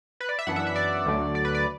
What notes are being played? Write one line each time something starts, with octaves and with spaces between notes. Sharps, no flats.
B4
D5
E5
F#2 E3 B3 D4 F#5
E5
E5
D5
D2 D3 F#3 A3
D5
B4
D5